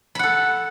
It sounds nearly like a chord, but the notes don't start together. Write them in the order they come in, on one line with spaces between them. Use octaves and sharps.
B5 F#5 A4